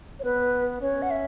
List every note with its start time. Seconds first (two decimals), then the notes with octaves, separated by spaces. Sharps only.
0.20 C#5
0.24 B3 B4
0.81 C#4 C#5
1.02 F#5
1.11 E5